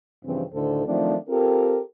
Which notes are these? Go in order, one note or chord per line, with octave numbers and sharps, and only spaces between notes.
G2 C#3 E3 F3 C4
D2 A2 D3 D#3 A4 C5
D#3 F3 F#3 A3 C4 D4
C4 F4 G4 A4 A#4